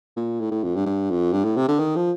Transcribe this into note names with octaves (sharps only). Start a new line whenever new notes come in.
A#2
A2
A2
F2
G2
G2
F2
G2
A2
C3
D3
D#3
F3